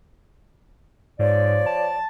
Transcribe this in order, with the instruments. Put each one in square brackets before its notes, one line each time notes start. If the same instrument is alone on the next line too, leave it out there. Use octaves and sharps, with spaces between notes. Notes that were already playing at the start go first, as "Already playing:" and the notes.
[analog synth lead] G#2 [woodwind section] F3 C#5 D5
[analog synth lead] A5